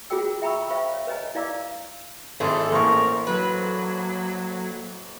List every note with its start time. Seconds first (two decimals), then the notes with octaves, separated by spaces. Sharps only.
0.10 F4 F#4 G#4 C#5 G5 E6
0.42 E5 G5 A#5 B5 C#6 E6
0.69 C5 E5 F5 G5 B5 C#6
0.94 C#5
1.07 B4 C#5 D#5 G#5 A#5
1.35 E4 D5 F5 A#5 D6 E6
2.40 G#1 A3 E4 G#4 A4
2.72 A1 A#3 A4 A#4 C5 C#6
3.27 F#3 B4